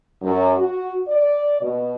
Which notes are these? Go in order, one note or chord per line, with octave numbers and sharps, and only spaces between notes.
F#2
F#4
D5
B2